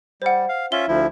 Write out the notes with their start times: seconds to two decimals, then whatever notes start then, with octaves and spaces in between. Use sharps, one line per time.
0.22 G3 C5 F#5
0.49 F5
0.72 C#4 F4 E5 G7
0.88 D2 F3 E4